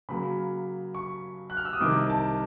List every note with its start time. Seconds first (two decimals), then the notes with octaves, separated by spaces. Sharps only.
0.09 C#3 F#3 A#3 B5
0.94 C#6
1.50 F#6
1.57 F6
1.65 E6
1.73 D#6
1.81 C2 C3 D#3 D6
2.10 A5